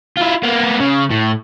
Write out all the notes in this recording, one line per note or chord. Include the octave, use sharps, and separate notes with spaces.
E4 F4
A#3 B3
C#3
A2